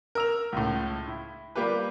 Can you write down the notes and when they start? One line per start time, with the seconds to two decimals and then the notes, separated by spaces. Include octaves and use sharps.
0.15 A#4 E6 F7
0.52 C#2 A2
1.07 E4
1.55 G3 A#3 F4 G4 B4